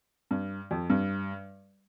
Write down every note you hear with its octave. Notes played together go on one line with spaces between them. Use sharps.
G2
F2
G2